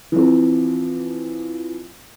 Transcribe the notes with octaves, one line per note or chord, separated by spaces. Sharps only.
E3 F3 C4